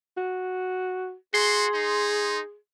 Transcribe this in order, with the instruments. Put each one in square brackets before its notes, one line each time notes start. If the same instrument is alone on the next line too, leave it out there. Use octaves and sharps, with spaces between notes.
[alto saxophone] F#4
[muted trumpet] F#4 [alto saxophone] G#4 [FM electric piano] C6
[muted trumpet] D#4